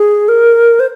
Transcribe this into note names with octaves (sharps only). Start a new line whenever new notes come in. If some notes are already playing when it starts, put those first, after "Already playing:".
Already playing: G#4
A#4
C5